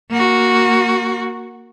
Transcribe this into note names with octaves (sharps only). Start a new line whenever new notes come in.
A#3 F#4